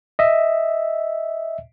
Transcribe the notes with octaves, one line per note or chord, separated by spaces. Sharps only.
D#5 E5